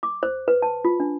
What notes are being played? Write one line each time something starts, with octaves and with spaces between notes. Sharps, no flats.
D6
C5
B4
A5
F4
D4